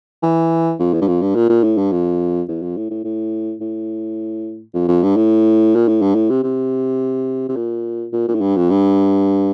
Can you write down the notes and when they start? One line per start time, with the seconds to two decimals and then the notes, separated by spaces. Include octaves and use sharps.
0.23 E3
0.79 F2
0.94 E2
1.02 G2
1.08 F2
1.21 G2
1.35 A#2
1.49 A#2
1.64 A2
1.78 G2
1.92 F2
2.48 E2
2.62 F2
2.77 A2
2.90 A2
3.04 A2
3.61 A2
4.74 F2
4.88 F2
5.03 G2
5.17 A2
5.75 A#2
5.88 A2
6.02 G2
6.15 A2
6.30 C3
6.43 C3
7.49 C3
7.56 A#2
8.13 A#2
8.28 A#2
8.35 A2
8.41 G2
8.56 F2
8.70 G2